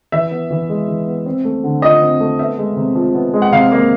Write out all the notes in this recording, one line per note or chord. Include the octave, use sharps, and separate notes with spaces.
E3 E5
B3
E3
G#3
E3
B3
C4
A3
D3
F3 D#5
C4
A3
B3 E5
G#3
C3
F3
B3
G#3
F#5
C3 F5
A#3